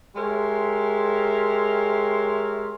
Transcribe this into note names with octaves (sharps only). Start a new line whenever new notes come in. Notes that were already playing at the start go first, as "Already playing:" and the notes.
G#3 G4 A#4 C#5 E5 C6